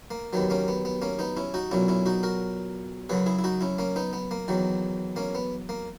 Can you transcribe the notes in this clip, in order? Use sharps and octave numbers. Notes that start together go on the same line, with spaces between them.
A#3
D#2 D#3 F#3 B3
A#3 C#4
B3
B3
A#3 C#4
B3 D#4
C#4 E4
D#4 F#4
B1 A#2 F#3 C#4 E4
C#4 E4
D#4 F#4
F#4 A#4
F#2 C#3 F#3 G#4 B4
E4 G#4
E4
D#4 F#4
C#4 E4
A#3 C#4
B3 D#4
B3
A#3
E2 D#3 F#3
A#3 C#4
B3
A#3